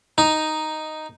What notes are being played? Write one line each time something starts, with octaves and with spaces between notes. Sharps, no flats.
D#4